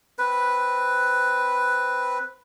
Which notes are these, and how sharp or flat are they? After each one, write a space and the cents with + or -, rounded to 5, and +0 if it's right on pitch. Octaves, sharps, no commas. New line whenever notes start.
C4 +0 B4 +0